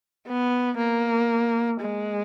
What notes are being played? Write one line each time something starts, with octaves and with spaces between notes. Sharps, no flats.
B3
A#3
G#3